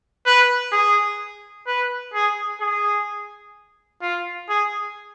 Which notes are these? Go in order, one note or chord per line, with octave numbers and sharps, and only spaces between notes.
B4
G#4
B4
G#4
G#4
F4
G#4